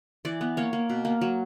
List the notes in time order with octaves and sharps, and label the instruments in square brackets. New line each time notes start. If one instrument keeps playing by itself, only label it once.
[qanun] E3 D5
B3
A#3 C#5
A#3
B2
A#3
F#3